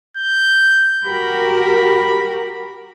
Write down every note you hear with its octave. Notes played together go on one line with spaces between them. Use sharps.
G6
F#4 G4 A#4 B5